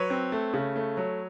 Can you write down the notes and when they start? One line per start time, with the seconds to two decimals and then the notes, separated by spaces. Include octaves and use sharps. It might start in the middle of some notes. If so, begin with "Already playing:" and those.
Already playing: F#3 B4 C#5
0.10 C4
0.32 A3
0.54 C#3
0.76 A3
0.97 F#3